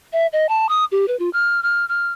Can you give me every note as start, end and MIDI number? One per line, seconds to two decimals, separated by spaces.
0.13 0.27 76
0.33 0.47 75
0.49 0.69 81
0.69 0.85 87
0.92 1.08 67
1.08 1.18 71
1.19 1.30 65
1.33 1.63 89
1.63 1.87 89
1.89 2.12 89